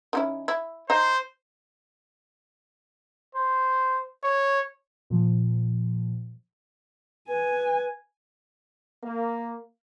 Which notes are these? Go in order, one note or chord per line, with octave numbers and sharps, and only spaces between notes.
D#3 C#4 E4
E4
D#4 C5
C5
C#5
A#2 F3
B4 G#5
A#3